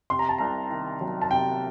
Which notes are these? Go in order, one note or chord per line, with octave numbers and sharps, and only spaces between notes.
C3 C6
A#5
A5
C2 A#5
D#3
F#3
A5
C3 G5